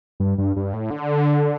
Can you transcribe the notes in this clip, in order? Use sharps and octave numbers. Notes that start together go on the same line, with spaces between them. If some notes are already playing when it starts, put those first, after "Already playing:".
G2
G2
G2
A2
D3